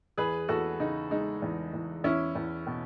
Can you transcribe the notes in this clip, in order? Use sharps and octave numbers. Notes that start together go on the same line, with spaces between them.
E2 G#4 B4
E2 F#4 A4
C#3 D#4
G#3 D#4
E2
E2
E2 C#4 E4
E2
B2